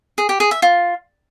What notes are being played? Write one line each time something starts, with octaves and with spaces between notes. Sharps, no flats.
G#4
G4
G#4
E5
F4